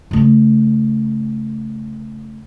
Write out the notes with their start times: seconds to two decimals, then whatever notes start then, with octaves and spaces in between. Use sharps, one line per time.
0.11 C#3 A3